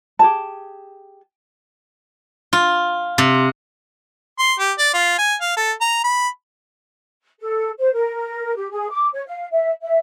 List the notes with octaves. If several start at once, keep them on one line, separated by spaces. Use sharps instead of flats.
G4 G#4 A5
F4
C3
C6
G4
D5
F4
G#5
F5
A4
A#5
B5
A4
C5
A#4
G4
G#4
D6
C#5
F5
E5
E5